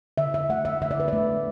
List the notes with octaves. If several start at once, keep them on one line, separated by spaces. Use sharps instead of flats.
D3 E5
E5
A3 F#5
E5
D3 E5
D5
B4
A3 D5